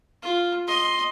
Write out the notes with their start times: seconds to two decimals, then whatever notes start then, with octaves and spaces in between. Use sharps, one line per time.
0.23 F4
0.68 D#5 C6